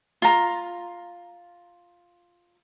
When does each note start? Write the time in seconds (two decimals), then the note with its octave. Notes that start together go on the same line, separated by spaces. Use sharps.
0.22 F4 A#5